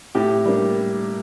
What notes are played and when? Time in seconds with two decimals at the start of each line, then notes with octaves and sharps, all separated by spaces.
0.15 A2 G4
0.45 G3 A#3 D4